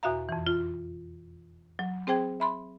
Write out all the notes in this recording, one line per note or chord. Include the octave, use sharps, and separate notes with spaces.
E2 B2 F#4 E5 F5 A#5
F2 E3
F4
F#3
C4 G#4 C5 G5 G#6
E5 B5 C6